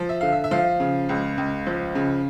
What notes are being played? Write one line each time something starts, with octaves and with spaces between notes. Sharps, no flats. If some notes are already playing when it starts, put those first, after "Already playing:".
Already playing: F3
E5
D3 F5
E5
E5
F3 F5
C#3
C#2
C#2
F3
C#3